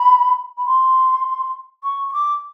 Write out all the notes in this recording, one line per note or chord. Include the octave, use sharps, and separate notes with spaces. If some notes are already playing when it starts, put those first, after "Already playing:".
Already playing: B5
B5
C6
C#6
C#6
D6